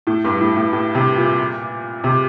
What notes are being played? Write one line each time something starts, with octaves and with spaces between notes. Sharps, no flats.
A2
G2
A2
A2
A2
C3
A#2
C3